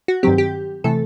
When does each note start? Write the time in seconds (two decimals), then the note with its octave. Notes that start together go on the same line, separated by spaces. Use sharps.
0.08 F#4
0.23 G2 D#3 F#3 C4 G4
0.38 G4
0.84 C3 E3 A3 A4